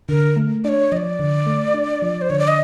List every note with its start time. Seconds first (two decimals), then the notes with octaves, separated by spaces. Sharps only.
0.09 D3 A#4
0.36 A3
0.64 D4 C#5 D5
0.92 F3 D#5
0.97 D5
1.19 D3
1.46 A3
1.74 D4
2.02 F3
2.21 C5
2.30 D3 C#5
2.39 D5
2.48 D#5